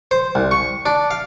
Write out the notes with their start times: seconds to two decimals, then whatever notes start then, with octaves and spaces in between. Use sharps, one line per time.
0.11 C5
0.35 C2
0.51 C#6
0.86 D4
1.11 F5